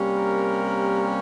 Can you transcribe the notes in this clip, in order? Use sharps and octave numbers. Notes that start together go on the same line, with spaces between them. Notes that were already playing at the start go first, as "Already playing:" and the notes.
Already playing: C3 G3 A#3 C#4
A#4